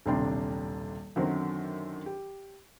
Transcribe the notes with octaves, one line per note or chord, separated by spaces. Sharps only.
D#1 B1 C3 D4 G5 C6
F#2 D3 D#3 F#3 C4
G4